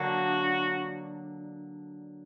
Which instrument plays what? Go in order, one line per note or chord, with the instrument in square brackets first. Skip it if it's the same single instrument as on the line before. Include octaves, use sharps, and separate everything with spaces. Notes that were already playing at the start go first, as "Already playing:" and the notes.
Already playing: [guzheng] D3 F#3 A#3 D4 [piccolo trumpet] F#4